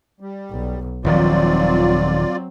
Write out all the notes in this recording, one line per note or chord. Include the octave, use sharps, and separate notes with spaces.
G3
B1
D#1 D#3 F3 F#3 C4 F4 D5